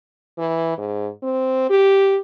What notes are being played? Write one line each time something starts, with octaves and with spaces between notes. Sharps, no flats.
E3
G#2
C4
G4